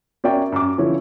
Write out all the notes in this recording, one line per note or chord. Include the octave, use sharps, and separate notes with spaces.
C#4 F#4 A#4 D5 E5 G5
F#2 D6
D3 E3 F3 C#4 E4 C#5